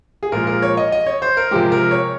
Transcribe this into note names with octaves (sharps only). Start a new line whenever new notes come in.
G#4
A#2 F3 G#3 A#4
A#4
C#5
D#5
D#5
C#5
C5
A#4
C3 F3 G#3 G4
A#4
C#5